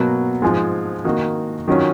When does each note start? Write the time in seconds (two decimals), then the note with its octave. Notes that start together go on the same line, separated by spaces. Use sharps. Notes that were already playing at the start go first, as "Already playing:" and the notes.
Already playing: B2 F#3 A#3
0.42 G#2 F3 G#3
1.05 D#3 A#3 D#4 F#4
1.68 D#3 F#3 C#4 F4